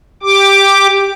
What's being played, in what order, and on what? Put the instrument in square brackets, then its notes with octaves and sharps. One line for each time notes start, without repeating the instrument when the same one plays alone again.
[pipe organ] G4 D6